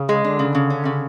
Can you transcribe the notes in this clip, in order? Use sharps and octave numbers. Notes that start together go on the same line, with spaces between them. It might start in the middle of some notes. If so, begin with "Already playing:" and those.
Already playing: C#3
G#3
D3 D4
C#3
C#3
C#4
C#3